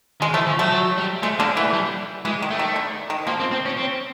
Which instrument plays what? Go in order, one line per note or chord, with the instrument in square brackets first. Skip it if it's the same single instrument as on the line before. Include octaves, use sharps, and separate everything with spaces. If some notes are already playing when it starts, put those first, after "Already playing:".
[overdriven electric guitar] D#3 [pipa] G#3
[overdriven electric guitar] E3 [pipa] A3
[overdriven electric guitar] F3
[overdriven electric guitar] F#3 [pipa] A3
[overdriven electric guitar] F#3
G3
[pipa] G#3 [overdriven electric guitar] A3
[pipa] D3 [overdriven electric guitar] A#3
[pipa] E3 [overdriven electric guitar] A3
[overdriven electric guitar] G3
[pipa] E3 [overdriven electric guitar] G#3
[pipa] D#3
[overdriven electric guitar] A3
[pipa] D#3
D3
D#3
[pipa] F3 [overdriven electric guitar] A#3
[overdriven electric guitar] C4
C4
C#4
C4